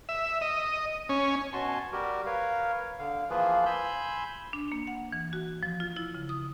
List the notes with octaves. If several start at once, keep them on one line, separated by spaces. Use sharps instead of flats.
E5
D#5
C#4
B2 F#4 G#5 A5 C6
G3 F#4 G4 A#4
A#4 B4 C#5 F5
D3 F5
E3 F3 A#3 F4 G#4 B4
G#5 B5 C6 E6 G6
D4
A#3
F#5
E3
F#4
F3
F4
E4
C#3
D#6